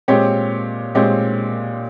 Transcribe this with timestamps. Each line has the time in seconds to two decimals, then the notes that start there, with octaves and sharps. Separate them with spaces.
0.08 A#2 G#3 C4 G4 C#5
0.95 A#2 G#3 C4 G4 C#5